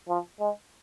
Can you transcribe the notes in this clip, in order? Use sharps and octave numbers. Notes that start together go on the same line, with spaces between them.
F3
G#3